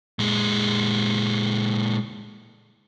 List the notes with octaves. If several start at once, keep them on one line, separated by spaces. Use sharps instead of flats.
A#2 G#3